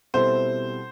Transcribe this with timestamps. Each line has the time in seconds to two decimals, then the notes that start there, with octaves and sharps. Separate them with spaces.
0.14 B2 G3 C4 E4 A4 C5